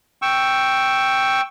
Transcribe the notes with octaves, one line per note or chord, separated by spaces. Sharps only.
G5 C#6 E6